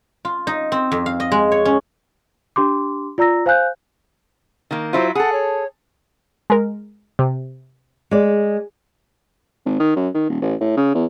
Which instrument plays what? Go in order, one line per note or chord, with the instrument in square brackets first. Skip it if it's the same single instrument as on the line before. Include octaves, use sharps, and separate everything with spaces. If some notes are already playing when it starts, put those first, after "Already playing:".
[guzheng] F4
D#4
C4
F2
F5
D#5
G#3
C#5
C#4
[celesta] D4 G4 C6 D6
F4 D5 A#5 E6 A#6
C5 F5 G#5 F#6 G6
[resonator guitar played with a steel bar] D#3 A#3
[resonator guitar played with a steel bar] F#3 E4 F4 [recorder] C5
[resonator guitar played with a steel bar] G#4 A4 [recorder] F#5
[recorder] C#5
[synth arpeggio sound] G#3 A#4
C3
[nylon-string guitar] G#3 D5
[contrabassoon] G#1
D#3
F#2
D#3
D#1
A1
A2
C#3
E2